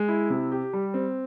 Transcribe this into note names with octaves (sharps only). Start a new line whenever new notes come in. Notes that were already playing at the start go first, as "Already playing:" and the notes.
Already playing: G#3
E4
C3
G4
G3
C4